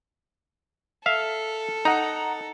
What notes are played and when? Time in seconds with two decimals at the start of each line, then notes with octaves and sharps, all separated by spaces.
1.06 A4 E5 F5
1.85 D#4 F#5 A#5